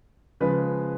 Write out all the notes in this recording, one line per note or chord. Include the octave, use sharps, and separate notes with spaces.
C#3 F3 G#3 B3 B4